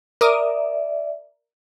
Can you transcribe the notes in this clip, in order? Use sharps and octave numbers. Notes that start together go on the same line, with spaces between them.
A#4 D5 E5 D6 D#6